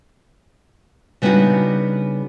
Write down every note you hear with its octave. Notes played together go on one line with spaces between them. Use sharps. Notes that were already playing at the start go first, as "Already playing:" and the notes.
C#3 G3 B3 D4 D#4 F#4